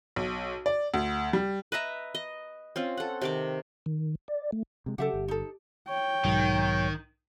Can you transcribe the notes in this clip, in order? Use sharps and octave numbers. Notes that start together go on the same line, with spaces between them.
B1
D5
D2
G3
B4 D#5 E5 A#5
D#5
C4 C#4 F4
A4 F#5
C3 D#3 D6
D#3
D5
A3
C3 G#3
C#3 F#3 G4 A4 E5 F#5
G1
D#4 A4
C#5 G5
B1 G#2 D#3 F#3